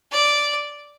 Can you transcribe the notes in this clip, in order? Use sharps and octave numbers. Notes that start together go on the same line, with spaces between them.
D5